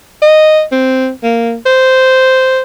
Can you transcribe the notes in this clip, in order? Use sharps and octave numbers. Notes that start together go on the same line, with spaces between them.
D#5
C4
A#3
C5